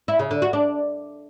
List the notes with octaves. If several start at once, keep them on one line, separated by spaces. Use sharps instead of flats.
E4
C#3
D3
F#4
D4